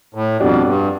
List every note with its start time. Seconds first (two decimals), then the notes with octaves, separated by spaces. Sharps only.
0.15 A2
0.40 F2 B2 G3 D4
0.66 G2